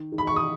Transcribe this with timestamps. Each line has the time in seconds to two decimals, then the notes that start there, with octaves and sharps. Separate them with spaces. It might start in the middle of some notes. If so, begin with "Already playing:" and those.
Already playing: D#3
0.12 D#3
0.18 B5
0.27 C#6
0.36 D#6